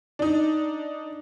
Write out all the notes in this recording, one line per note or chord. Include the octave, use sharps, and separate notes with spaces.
D4 D#4